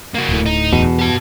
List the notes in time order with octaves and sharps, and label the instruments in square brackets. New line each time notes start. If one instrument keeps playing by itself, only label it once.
[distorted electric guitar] A#3 F#4
[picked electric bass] D1 A2
[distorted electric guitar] D#4
[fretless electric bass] E2 [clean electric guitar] B2
[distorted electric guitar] G4 A5